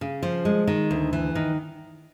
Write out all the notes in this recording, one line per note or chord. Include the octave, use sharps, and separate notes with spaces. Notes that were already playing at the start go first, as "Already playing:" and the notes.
C#3
F3
G#3
D#3
D2
E3
D#3